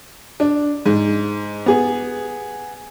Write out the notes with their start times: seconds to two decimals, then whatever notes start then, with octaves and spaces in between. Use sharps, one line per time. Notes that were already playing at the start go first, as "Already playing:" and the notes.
0.40 D4
0.86 G#2
1.66 B3 G#4